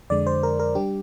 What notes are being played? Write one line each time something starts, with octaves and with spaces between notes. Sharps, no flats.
F2 D3 G#3 D5
C5
A#4
A#4
G3 D4 G4